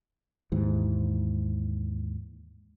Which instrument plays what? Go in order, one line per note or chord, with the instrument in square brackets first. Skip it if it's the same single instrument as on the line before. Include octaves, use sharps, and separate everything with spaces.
[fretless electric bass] D#2 G#2 E3